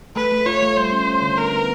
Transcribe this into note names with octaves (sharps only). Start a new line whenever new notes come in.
A3 B4
A3
F4 C#5
A3
G3 C5
C#4
C#4
D3
B3 A#4
B3